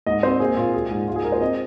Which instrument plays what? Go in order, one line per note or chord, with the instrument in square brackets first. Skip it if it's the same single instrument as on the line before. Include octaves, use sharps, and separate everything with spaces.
[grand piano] G#2 D#5
C4 C5
A#3 G#4
A#2 F4
G#3 G#4
G#2
G#3 F4
G#4
G#3 A#4
C5
C4 D#5